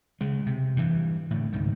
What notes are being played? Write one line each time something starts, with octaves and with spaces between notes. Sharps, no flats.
C#3 G#3
C3
G2 E3
A2 D3
C#2 G#2 D#3